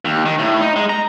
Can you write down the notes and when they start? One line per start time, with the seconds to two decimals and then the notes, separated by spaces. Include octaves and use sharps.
0.05 D#2
0.25 D#3
0.39 A2
0.61 D#4
0.76 G#3
0.89 A#5